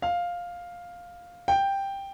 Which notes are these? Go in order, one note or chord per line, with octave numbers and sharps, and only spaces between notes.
F5
G5